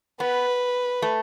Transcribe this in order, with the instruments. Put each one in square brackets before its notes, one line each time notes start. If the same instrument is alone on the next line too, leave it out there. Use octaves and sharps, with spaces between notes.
[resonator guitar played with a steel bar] B3 [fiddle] B4
[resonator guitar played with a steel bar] A3